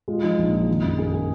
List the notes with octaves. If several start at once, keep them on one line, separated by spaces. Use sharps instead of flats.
G#3 F4
F3 D#4
A#1
F3
D#3
F#2
A#3 G#4
G#4